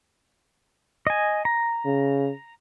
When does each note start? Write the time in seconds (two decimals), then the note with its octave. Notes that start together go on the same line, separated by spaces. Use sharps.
1.07 D#5 G#5
1.45 A#5
1.85 C#3